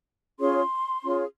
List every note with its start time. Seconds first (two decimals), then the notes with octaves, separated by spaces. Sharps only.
0.39 C#4 F4 G#4 C#5 C6
1.02 C#4 F4 G#4 C#5